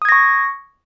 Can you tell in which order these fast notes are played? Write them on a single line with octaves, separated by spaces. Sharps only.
D#6 G#6 A#6 C#6